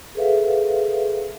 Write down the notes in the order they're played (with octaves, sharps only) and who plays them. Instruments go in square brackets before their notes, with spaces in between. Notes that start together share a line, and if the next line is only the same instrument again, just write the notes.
[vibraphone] G#4 A4 B4 E5 F5